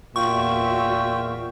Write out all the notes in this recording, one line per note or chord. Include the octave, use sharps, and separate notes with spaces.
E2 A#2 F4 F#4 E5 G5 C#6